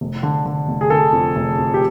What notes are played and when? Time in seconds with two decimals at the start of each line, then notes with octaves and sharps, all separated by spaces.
0.01 F1
0.23 D3
0.46 D3
0.68 F1
0.81 G#4
0.90 D3 A4
1.13 F2
1.36 F1
1.58 F2
1.74 G4